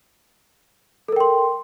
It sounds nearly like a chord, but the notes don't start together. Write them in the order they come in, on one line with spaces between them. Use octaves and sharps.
A4 A#4 G5 C6